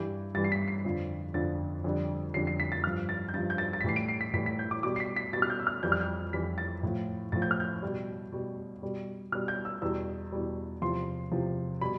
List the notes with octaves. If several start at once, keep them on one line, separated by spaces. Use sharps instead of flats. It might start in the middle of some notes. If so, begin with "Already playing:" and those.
Already playing: G2 E3 G3 G6
G2 E3 G3 A6
C7
B6
C7
F2 D3 F3
F2 D3 F3 A6
F2 D3 G3
F2 D3 G3 C7
C7
B6
A6
G2 F3 F6
A6
G6
G2 F3 A6
G6
A6
A6
B6
A2 E3 G3 C7
D7
C7
B6
A2 E3 G3 B6
B6
G6
D6
B2 G3 D6
C7
B6
B6
B2 G3 A6
F6
G6
E6
F6
F2 E3 G3 G6
F6
G6
F2 E3 G3 B6
A6
A2 F3
A2 F3 A6
G6
F6
G6
B2 G3
B2 G3
B2 G3
B2 G3 F6
G6
E6
E2 B2 G3 E6
E2 B2 G3
E2 C3 F3 C6
E2 C3 F3
B2 G3 B5